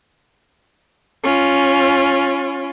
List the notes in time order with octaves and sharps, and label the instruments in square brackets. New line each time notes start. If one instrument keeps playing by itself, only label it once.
[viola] C#4 F4